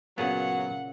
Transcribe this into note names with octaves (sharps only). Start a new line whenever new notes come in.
A#2 C#3 F#3 B3 G#4 F#5